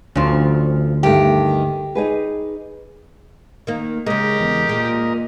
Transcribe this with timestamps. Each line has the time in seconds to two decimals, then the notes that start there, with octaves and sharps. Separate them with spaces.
0.16 D2 G2 F3 C#4
1.03 G2 D#3 A3 G4
1.95 D#4 G#4 B4
3.67 D#3 A#3
4.06 C#3 G#3 G4 A#4 D#5
4.37 E2
4.69 A#2 G#3